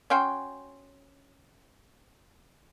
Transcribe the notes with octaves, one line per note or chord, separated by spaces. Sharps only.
C#4 F#4 G5 C6